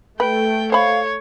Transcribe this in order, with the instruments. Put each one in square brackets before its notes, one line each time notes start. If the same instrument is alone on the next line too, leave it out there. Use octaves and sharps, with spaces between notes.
[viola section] A3 [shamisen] B4 [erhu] G5
[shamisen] C5 B5 [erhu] C#5 [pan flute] F5